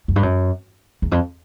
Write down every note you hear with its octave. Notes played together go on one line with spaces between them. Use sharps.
F#2
G2
F#2
E2
F2